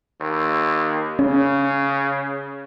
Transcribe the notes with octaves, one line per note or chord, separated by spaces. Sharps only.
D#2
C#3 C#4